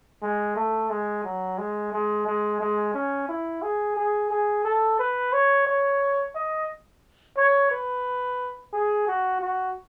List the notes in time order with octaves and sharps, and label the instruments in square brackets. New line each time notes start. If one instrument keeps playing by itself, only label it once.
[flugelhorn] G#3
A3
G#3
F#3
G#3
G#3
G#3
G#3
C#4
E4
G#4
G#4
G#4
A4
B4
C#5
C#5
D#5
C#5
B4
G#4
F#4
F#4